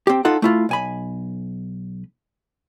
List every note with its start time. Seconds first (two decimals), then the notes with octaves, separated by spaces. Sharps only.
0.07 C4 G4
0.25 D#4 F4 A4 F#5
0.42 A3 E4 F4
0.69 B1 G#5 B5